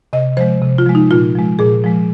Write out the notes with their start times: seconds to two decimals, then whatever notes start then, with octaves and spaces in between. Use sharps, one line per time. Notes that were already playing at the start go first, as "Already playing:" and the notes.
0.13 C3 D#5
0.37 F3 G#3 C5
0.61 C3
0.78 F4
0.86 F3 G#3
0.95 D#4
1.11 A#2 F4
1.35 F3 G#3
1.59 A#2 G#4
1.84 F3 G#3